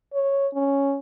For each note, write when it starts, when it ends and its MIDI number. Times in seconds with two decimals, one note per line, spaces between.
0.14 0.48 73
0.54 0.99 61